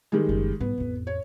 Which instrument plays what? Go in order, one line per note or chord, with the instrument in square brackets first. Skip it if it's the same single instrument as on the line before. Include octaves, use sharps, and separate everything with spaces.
[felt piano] D#3 G3 G#3
[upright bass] F#1 C#4
[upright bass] G#2 G3 [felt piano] B3
[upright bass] A1 F2
[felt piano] C#5